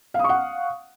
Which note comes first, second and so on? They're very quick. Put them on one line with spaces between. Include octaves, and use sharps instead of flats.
F5 D#6 C#6 F#5